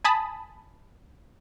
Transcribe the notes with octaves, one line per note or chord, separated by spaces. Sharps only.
G#5 A5 B5 D#6